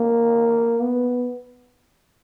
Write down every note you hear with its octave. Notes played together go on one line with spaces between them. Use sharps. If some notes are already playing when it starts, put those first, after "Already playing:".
Already playing: A#3
B3